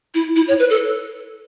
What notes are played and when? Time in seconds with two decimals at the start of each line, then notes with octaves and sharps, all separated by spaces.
0.15 E4
0.36 E4
0.48 C#5
0.59 B4
0.70 A4